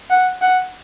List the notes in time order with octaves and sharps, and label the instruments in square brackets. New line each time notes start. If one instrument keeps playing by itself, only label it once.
[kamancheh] F#5
F#5